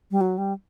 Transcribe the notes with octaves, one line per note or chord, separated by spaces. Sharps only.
G3
F#3
G3